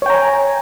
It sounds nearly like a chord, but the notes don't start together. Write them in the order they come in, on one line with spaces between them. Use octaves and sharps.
C#5 G5 A#5 G#5